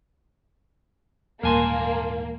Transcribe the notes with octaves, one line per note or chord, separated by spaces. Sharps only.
D#1 G#2 E3 A#3 A#4 G#5 A5 C6